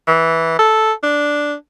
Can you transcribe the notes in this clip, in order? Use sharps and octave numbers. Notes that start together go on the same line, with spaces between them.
E3
A4
D4